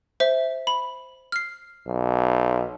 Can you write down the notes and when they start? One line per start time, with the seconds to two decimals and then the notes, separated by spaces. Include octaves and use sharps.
0.20 C5 E5
0.67 B5
1.32 F6 C7
1.87 B1